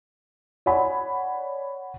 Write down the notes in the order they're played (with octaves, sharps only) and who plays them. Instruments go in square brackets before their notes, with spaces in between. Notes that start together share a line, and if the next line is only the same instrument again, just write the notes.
[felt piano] C#5 D5 F#5 G#5 B5